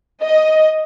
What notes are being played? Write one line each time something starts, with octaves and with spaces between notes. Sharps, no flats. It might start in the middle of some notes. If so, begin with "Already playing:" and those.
D#5